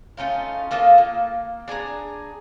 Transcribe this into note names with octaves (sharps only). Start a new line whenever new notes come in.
A3 C#4 D#4 F4
A#3 F4 A4 D#5
A#3
D4 G#4 G#5 A#5